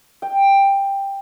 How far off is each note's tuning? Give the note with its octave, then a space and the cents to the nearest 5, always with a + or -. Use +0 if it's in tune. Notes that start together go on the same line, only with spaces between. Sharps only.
G5 +10